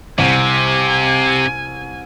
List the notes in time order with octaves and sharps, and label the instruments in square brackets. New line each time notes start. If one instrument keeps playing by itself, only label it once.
[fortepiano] C2 [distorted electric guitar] C3 [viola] G#5